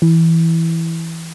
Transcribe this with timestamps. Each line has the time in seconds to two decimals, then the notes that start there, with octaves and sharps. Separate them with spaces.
0.02 E3